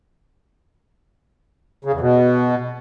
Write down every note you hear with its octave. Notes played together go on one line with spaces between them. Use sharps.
C#3
E2
B2